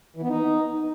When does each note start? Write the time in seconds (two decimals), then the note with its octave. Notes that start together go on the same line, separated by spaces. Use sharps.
0.17 E3
0.23 B3
0.28 D#4